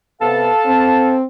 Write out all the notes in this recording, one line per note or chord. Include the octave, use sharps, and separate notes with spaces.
C3 B3 A4 F5 A5
C4